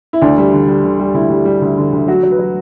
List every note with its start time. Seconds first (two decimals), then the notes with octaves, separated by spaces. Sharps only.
0.13 E4
0.21 D2 D4
0.37 G3
0.53 D3
0.67 G3
0.84 D3
0.99 G3
1.14 D2 E4
1.30 G3
1.45 G3
1.61 D2
1.77 D3
1.92 D2
2.07 F#3 F#4
2.23 F#3
2.31 B4
2.39 F#3